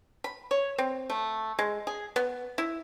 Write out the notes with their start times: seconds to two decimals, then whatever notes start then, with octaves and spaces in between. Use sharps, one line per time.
0.24 B5
0.51 C#5
0.78 C4
1.10 A3
1.59 G#3
1.87 G#4
2.16 B3
2.58 E4